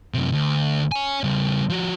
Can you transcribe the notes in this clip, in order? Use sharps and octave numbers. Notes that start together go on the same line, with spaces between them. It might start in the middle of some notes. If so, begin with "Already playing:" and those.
F#2 C3
D2
C#5 G#5
C#3 G3
F3 F#4